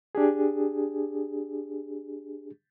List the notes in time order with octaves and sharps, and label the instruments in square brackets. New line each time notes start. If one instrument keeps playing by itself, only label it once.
[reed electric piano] D4 G4 G#4